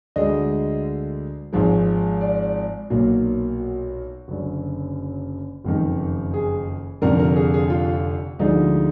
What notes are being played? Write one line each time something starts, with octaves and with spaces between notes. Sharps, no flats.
D2 D3 G#3 D#5
G#1 G#2 F3 G#3
D5
B1 A#2 F#3 A#3
F#4
F#1 F#2 D3
F#1 F2 D#3
G#4
F1 F2 D3 A#4
A#4
G#4
G#4
F4
D2 D3 F3 G#3 D#4